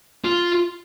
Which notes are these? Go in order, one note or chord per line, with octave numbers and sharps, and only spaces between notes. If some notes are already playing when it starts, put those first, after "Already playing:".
F4